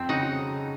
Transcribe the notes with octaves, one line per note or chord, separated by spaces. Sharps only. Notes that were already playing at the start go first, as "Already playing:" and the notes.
Already playing: F2 C4
C#3 D#4 F#4